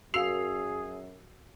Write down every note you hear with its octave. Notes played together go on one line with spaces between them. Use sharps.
F#2 F#4 G#4 F5 E6 C7 F7